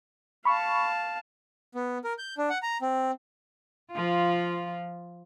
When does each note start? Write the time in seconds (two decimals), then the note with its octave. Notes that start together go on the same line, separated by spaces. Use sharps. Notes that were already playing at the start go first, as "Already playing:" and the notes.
0.45 F5 A5 B5 C#6
1.75 B3
2.04 A#4
2.18 G6
2.38 D4
2.50 F#5
2.63 A#5
2.82 C4
3.91 F3 F4